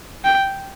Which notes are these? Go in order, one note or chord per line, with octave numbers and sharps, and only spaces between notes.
G5